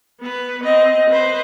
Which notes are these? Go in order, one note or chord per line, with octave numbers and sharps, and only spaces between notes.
B3 B4
C4 D#5
B4 C5